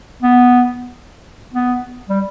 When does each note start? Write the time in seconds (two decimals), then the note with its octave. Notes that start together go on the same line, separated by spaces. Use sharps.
0.23 B3
1.54 B3
2.09 G3